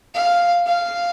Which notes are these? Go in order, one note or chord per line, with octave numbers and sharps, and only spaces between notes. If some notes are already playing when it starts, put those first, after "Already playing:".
F5
F5